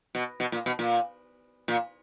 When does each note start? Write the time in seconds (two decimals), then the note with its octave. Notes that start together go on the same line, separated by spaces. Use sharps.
0.15 B2
0.40 B2
0.52 A#2
0.66 B2
0.79 A#2
1.68 A#2